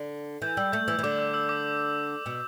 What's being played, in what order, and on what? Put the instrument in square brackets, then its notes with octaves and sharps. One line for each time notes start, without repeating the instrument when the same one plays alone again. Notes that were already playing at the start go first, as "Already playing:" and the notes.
Already playing: [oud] D3
[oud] E3 [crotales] G6
[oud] G3 [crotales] E6
[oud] A3 [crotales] G6
[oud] E3 [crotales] E6
[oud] E3
[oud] D3 [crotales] D6
[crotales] E6
E6
D6
[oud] B2